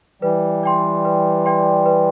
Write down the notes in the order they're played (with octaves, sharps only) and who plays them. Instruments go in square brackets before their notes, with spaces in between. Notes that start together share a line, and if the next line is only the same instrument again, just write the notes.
[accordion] E3 G3 [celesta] B4
[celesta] D5 G5 C6
B4
D5 G5 C6
B4